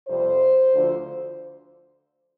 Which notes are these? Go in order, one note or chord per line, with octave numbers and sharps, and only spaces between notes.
F2 C3 G3 C5
D2 D3 F3